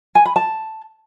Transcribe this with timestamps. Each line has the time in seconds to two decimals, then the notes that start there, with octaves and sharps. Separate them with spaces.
0.15 G#5
0.26 B5
0.36 A5